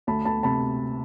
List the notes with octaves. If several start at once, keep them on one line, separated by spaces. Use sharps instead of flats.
D2 A5 B5
D2 A5 B5
C3 A5 B5